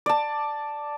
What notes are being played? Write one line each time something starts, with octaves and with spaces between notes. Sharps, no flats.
D5 A5